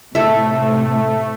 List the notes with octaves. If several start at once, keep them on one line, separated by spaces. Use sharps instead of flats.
A2 C3 A3 A4 E5